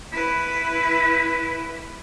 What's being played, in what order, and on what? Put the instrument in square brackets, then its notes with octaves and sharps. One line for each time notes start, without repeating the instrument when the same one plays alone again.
[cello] E4 B4